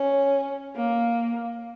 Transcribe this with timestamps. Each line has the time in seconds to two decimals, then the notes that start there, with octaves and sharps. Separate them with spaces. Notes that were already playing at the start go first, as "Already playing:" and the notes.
Already playing: C#4
0.76 A#3